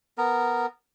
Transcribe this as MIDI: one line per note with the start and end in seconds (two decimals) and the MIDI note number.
0.18 0.66 59
0.18 0.66 70